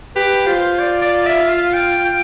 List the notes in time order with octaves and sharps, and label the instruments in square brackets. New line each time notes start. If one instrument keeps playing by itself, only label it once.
[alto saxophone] G4 [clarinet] B4
[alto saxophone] F4 [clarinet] C5
[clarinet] D5
D5
E5
F5
G5
G5